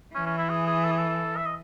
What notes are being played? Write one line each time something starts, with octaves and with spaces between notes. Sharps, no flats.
E3 C#4
C#4
E4
G#4
G#4
A4
G#4
A4
E5
D#5